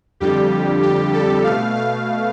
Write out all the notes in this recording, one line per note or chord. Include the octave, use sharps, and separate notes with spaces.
F2 D3 G3 G4
G4
A4
B2 A3 F5
F5